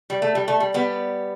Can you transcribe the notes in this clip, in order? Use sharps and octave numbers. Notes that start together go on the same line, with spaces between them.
G3
A3
G3
A3
G3
G3 B3